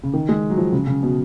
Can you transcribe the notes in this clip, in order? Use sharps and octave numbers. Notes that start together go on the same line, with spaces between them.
C#3
D#3
G#3
F#3
F3
C#3
C#3
B2